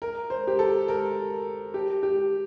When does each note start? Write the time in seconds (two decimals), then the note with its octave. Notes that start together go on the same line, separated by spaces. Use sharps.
0.02 A#4
0.30 C5
0.47 G4
0.59 A4
0.88 A#4
1.74 G4
2.03 G4